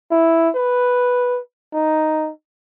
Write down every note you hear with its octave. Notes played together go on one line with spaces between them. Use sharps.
E4
B4
D#4